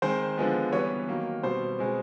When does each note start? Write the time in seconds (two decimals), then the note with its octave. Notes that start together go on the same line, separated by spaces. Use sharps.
0.02 D#3 G#3 C4 C5
0.37 D3 F3 G#3 B3
0.72 E3 G3 B3 C#5
1.08 D#3 F#3 A#3
1.43 B2 G3 C4 C5
1.79 B2 G#3 C4